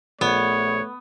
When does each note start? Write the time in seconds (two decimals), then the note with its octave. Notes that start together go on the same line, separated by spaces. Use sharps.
0.21 A#1 A3 B3 C#5